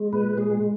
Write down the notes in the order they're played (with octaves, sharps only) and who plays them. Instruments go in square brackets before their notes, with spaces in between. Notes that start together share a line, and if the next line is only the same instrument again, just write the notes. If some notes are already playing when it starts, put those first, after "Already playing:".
Already playing: [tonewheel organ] G#3
A#2 B4
G#3 G#4